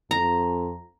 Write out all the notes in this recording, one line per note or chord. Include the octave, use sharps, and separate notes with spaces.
F2 A#5